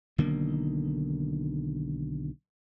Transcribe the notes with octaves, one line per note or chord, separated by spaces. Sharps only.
B1 D3 D#3 A#3